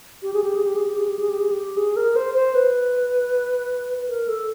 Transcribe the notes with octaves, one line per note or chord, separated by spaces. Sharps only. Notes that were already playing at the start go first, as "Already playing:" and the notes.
G4
G#4
G4
G#4
G4
G#4
G4
G#4
G4
G#4
G4
G#4
G4
G#4
A#4
C5
C5
B4
A#4
A4